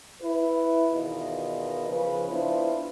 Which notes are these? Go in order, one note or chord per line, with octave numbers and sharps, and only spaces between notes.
E4 B4
E2 B2 D#3 F4 A#4 D#5
C#3 F3 B4
B3 D4 E4 F4 B4 C5